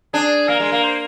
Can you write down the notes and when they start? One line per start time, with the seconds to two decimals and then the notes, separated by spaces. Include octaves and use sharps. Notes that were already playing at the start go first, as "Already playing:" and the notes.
0.14 D4 G#4
0.48 A#3 A#4
0.60 G#3
0.72 A#3
0.84 C5